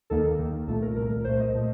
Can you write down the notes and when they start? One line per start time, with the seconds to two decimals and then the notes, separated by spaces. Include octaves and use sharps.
0.10 D#2 D#3 A#3 A4
0.39 D#2 D#3 A#3
0.67 C2 A#2 A3 A4
0.82 A#4
0.96 C2 A#2 A3 A#4
1.11 A#4
1.24 C2 A#2 A3 C5
1.40 D#5
1.54 A#2 A3